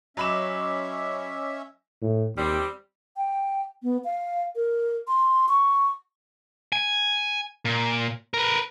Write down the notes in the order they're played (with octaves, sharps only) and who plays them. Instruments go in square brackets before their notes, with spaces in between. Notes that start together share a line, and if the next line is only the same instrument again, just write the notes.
[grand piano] F#3 B5 E7 [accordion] C#4 E5 [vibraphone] D#5 D6
[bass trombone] A2
[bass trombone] D#2 [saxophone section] G3 C4
[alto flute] G5
B3
F5
A#4
C6
C#6
[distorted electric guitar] G#5
A#2
A#4 B4